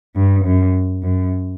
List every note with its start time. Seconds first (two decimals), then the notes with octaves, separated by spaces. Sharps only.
0.15 G2
0.45 F#2
1.03 F#2